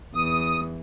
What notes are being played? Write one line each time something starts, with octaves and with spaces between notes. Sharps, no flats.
E2 D#6